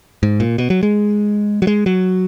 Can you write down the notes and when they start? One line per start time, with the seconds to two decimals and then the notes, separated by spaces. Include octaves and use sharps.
0.23 G#2
0.40 A#2
0.58 B2
0.70 F#3
0.83 G#3
1.62 F#3
1.67 G#3
1.86 F#3